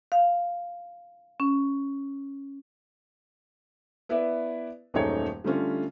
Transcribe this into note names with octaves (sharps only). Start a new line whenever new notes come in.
F5
C#4
B3 E4 B4 D5 E5
D#1 F#2 A3 D#4 G#4 C#5
D3 G3 A3 C#4 F4